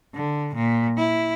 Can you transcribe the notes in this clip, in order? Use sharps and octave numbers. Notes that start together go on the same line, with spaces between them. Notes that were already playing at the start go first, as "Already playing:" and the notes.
D3
A#2
E4